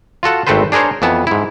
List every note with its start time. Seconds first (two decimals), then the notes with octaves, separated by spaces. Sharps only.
0.23 F4 F#4 A4 F#5
0.47 G#1 A3 C4 A4 B4 C5
0.72 D4 G#4 A#4 C5 C#5
1.02 F2 E3 B3 A5
1.27 G#2 E4